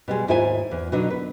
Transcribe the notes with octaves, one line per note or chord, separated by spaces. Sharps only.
B2 G3 G#3
D#2 G#2 E4 F4 G5 G#5
E2
B2 D3 F#3 D4 D#4
B4